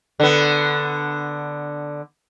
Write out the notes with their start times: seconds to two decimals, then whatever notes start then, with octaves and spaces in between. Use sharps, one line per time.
0.20 D3 B3